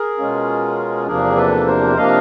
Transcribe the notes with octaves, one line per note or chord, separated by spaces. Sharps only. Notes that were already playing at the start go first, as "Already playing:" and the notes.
Already playing: G#4 A#4
B2 G#3 C#4 F4
E2 C3 F3 A#3 D4 G#4 A#4
A4 B4
A#4 C5
C3 F3 A#3 D4 D#5 F5